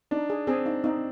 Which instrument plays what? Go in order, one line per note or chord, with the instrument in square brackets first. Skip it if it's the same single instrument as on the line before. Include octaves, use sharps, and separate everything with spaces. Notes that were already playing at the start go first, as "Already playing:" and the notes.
[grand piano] D4 [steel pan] D#4
[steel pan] G#4
[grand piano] C4 [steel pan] G#4
[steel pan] D#4
[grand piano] C4 [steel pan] D#4